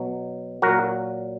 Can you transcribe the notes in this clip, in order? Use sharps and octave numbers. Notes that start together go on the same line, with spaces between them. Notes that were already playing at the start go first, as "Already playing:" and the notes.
Already playing: B2 F#3
A#2 F#3 F#4 A#4